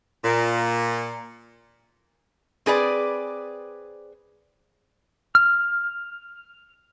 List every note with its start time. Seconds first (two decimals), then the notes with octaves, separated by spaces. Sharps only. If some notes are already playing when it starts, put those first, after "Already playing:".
0.24 A#2
2.66 C4 G#4 B4 D5
5.35 F6